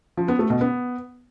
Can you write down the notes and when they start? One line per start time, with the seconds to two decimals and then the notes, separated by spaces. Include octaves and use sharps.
0.17 F3
0.28 B3
0.39 A3
0.50 B2
0.61 B3